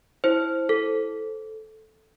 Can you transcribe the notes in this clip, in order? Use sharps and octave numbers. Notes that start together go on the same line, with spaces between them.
E4 C5
A4